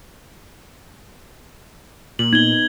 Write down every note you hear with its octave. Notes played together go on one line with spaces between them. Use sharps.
A#2 F#7
B3 D#4 G#6 G7